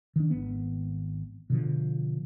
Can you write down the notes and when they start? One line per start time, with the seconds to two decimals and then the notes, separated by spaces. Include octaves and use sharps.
0.16 D#3 D4
0.30 G#1 B3
1.50 B2 D3 F3